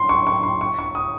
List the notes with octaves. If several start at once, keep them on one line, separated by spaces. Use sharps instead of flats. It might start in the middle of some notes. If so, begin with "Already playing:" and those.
Already playing: C6
C#6
C#6
C6
C#6
C#6
D#6